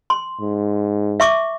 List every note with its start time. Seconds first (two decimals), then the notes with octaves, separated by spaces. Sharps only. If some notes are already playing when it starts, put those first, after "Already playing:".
0.10 C6
0.41 G#2
1.20 E5 C#6 D6